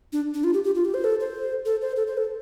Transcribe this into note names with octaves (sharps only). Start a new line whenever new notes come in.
D4
D4
F4
G4
G4
F4
G4
C5
A4
C5
A4
C5
A4
C5
A4